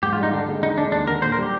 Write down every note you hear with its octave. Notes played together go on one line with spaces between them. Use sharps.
G#2 G4
F4
G3 D#4
D3 D4
G#3
D3 D#4
G#3 D4
D#2 D4
D3 A#4
A#2 C5
A#4
G3 G4